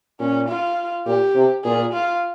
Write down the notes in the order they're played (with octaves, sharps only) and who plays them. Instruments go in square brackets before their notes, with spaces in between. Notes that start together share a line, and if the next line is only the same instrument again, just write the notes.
[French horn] A#2 [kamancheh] C#4
[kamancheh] F4
[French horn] A#2 [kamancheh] G4
[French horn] C3
[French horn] A#2 [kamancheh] G#4
[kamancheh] F4